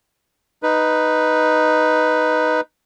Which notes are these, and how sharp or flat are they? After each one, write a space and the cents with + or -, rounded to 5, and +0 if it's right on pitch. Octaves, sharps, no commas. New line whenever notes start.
D#4 +0 B4 +0